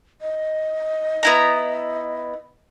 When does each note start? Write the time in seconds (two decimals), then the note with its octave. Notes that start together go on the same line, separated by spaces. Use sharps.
0.22 D#5
1.23 B3 E4 A#5